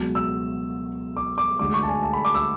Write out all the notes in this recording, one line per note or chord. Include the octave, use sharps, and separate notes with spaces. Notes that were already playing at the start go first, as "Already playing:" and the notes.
Already playing: C#2 B2 F#3
E6
D6
D6
D2 D3 G#3 D6
C#6
A5
G#5
A5
B5
D6
E6